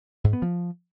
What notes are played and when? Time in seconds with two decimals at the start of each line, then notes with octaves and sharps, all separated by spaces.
0.24 G#2
0.33 B3
0.42 F3